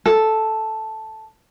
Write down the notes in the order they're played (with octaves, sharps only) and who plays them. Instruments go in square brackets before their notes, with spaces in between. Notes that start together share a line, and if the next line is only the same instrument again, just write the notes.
[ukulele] A4